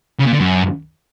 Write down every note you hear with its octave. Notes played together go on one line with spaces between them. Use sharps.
C#3
A#2
D3
F#2